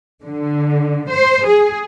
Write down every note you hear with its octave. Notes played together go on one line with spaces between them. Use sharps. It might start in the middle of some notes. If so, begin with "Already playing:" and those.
D3
C5
G#4